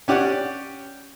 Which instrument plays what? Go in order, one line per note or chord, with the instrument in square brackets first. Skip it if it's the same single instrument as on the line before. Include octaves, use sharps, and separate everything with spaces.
[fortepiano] C#4 G4 D5 F#5